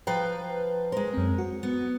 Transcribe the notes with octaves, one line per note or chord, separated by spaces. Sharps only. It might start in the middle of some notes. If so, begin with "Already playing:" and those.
F3 B4 C5 G5 A#5
G#3 A#4 C5
F#2 C4
F#4
B3